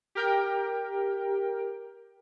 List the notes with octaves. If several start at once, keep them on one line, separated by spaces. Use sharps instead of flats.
G4 A#4 G5